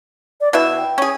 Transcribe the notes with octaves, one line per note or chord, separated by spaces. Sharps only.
D5
B2 E4 B4 E5
G5
C#4 G#4